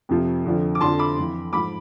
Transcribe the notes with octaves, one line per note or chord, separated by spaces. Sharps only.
F2 C3 F3
F2 D3 F3
D6
F2 D3 F3 A5 C6
B5 D6
F2 E3
G#2 F3 B5 D6